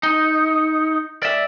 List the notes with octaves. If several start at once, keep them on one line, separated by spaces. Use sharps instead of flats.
D#4
D5 E5